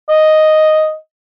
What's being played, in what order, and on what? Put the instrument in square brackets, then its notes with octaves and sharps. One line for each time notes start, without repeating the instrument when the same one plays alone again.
[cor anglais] D#5